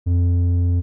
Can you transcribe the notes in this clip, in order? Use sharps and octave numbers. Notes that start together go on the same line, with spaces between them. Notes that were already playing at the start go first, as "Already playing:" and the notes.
F2